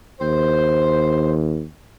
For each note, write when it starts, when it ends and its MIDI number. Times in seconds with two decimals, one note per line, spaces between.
0.21 1.65 39
0.21 1.33 72